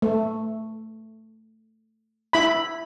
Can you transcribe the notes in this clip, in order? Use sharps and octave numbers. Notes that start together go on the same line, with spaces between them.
A3
E4 B5